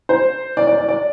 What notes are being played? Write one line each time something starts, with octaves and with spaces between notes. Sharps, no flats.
C5
D5
D5
D5
D5